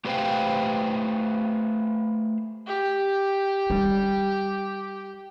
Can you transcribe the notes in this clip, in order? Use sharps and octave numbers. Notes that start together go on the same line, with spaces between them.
A3 G4 B4 C5 F5 G5
G4
G3